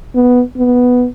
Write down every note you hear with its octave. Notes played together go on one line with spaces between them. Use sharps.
B3
B3